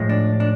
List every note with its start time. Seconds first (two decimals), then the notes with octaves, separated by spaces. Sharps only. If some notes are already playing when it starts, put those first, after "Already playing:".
Already playing: A2 F3 G#3
0.09 D4
0.40 D4